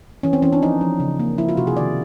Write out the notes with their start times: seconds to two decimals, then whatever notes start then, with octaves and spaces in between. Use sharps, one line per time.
0.23 E3 C#4
0.33 C4
0.42 E3 C#4
0.53 D4
0.62 F3 D#4
0.81 F3
1.00 C#3
1.20 A#3
1.38 F3 E4
1.49 F4
1.57 C3 F#4
1.67 G#4
1.77 D#3 D5